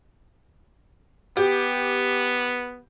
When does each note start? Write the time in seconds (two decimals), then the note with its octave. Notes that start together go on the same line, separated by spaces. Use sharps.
1.37 B3 G4